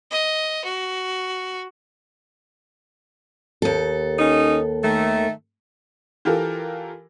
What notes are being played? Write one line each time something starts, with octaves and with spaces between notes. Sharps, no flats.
D#5
F#4
D#2 A4
C#4 D#4
D#3 A3
E3 F4 G4 A4 A#4